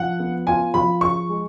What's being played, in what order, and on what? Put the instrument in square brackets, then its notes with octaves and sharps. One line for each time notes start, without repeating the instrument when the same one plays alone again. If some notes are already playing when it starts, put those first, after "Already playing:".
Already playing: [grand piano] F3 [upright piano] F#5
[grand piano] B3
[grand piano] F4 [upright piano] G#5
[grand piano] F3 [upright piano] B5
[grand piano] G#4 [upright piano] C#6
[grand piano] G#3